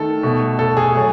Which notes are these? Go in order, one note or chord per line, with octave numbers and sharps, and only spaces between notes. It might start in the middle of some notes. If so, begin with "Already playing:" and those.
Already playing: D#3 A3 A4
B2 A3
A4
G#4
F#3 A3